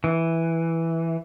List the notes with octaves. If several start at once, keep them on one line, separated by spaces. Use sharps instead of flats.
E3